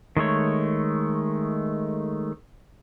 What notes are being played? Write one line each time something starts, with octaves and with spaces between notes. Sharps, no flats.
D#3 G#3 A3 C#5